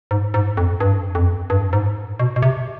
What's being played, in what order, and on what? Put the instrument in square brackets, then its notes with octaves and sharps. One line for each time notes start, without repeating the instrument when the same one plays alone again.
[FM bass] G#2
G#2
F2
G2
F2
G2
G#2
B2
B2
C3